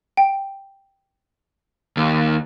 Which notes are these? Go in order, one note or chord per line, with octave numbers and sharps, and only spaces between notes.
G5
D#2